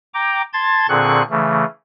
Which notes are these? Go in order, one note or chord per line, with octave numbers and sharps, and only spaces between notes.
G5 A#5 D6
A5 C6 G#6 A6
A#2 D3 C4 G#4 C#6 F#6
C#3 E3 A3